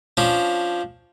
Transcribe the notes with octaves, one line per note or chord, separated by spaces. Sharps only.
F3 C#4 D4